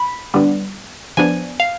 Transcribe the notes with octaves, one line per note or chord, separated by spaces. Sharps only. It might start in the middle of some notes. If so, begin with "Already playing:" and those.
Already playing: B5
D3 G3 B3 D4
F3 B3 D4 G#5
F5